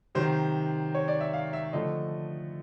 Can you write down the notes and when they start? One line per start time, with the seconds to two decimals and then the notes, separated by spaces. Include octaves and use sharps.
0.15 C3 D#3 F#3 C5
0.94 C#5
1.08 D5
1.20 E5
1.33 F5
1.53 E5
1.73 D3 F3 A3 D#5